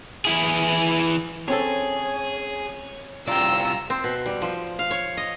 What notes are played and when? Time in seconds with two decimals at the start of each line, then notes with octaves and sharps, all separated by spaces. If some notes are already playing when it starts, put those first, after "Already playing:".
0.25 E3 E4 G#4
1.48 C4 C#4 G#4 A4 C#5
3.28 C2 F4 D5 G5 A#5 E6
3.90 C4
4.04 B2
4.26 G3
4.42 F3
4.79 F5
4.91 C#5
5.17 D#5